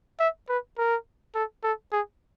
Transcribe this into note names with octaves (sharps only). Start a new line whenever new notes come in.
E5
B4
A#4
A4
A4
G#4